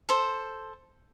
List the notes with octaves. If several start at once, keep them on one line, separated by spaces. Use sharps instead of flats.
A4 C5